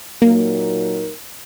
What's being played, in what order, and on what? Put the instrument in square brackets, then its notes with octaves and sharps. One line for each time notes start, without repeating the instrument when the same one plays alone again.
[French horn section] A#2 F#3 D#4 A#4 [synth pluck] A#3